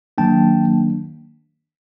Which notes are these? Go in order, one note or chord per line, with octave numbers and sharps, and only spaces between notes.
D#3 F#3 A#3 D4 G5 A5